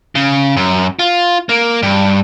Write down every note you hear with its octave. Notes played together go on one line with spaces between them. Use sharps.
C#3
F#2
F4
A#3
G2